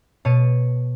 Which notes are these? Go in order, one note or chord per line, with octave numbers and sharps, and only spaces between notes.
B2 C#5 A5 D#7